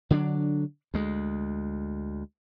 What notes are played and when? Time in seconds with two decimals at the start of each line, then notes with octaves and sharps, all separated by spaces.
0.10 D3 F#3 C4 D4
0.94 D2 G#3